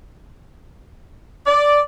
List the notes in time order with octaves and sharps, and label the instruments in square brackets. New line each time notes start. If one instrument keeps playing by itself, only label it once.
[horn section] D5